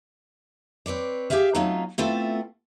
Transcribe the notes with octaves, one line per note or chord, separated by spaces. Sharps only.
C4 B4 C#5 D5
G4 G#4 B4 E5 F5
F#3 A3 C4 C#4 D#4 F4
A3 B3 C4 E4 F4 A4